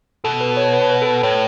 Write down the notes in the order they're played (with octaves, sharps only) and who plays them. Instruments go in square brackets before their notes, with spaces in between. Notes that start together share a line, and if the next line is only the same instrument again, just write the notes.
[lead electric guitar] B2 [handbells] A4
[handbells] B4
C#5
B4
B4
A4
B4
[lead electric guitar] A2 [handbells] C#5